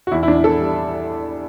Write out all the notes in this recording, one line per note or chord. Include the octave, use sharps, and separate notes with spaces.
F#4
E2 E4
E4
E2 D4
E2 A4
G3